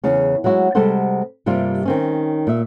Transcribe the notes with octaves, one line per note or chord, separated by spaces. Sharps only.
E2 C#3 C#4
F#3 G#3 E4 F#4
C3 G3 G#3 A4 C5 F#5
G2 C3 G3 A#3 F4
D#3 C4 C#4
A#2 E5